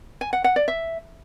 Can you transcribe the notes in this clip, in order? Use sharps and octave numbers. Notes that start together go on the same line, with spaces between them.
G#5
F#5
F#5
D5
E5